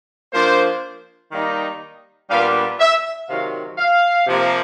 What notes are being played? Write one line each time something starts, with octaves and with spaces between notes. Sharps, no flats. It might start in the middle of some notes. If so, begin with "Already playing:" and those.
F3 A#3 D4 C5
D#3 G3 A#3 D#4
A#2 G3 B3 D4 F5
E5
C3 D#3 F#3 F5
F5
C3 F3 A#3